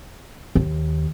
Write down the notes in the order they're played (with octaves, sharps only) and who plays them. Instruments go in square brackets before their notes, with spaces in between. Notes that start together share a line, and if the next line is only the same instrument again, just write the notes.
[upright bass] D#2